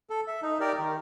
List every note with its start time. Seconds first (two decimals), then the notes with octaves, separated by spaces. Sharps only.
0.10 A4
0.27 E5
0.43 D#4
0.60 G4 A#4 D5
0.79 D#3